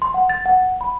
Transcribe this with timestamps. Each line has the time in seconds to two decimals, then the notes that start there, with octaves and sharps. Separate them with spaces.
0.02 C6
0.14 F#5
0.29 A6
0.46 F#5
0.81 B5